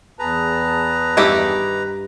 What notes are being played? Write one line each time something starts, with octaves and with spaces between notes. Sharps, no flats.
E2 G#4 B4 A5 A#5
G2 D#3 E4 G4